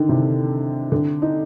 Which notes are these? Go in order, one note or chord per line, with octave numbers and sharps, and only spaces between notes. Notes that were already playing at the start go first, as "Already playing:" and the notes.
Already playing: D3 D#3
C3
D3
D#4